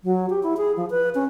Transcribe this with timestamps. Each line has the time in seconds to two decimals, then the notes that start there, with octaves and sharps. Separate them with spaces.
0.04 F#3
0.30 G4
0.43 E4
0.57 G#4
0.77 F3
0.90 B4
1.15 C#4